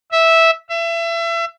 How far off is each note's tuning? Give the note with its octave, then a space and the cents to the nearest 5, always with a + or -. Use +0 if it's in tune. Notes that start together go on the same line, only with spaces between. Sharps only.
E5 -10
E5 +30